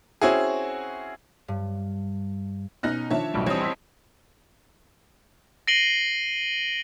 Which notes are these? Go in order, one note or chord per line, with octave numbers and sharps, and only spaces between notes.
C4 C#4 E4 F#4 G#4
G2
B2 C#4 D#4 F6 F#6 A#6
D#3 F3 D4 C#5 E5 A5
B1 A2 G3
E3 G3 C4 C5 C#5 D#5 A5 D#6
C6 E6 B6
A#6 C7 D7 D#7 F#7 G7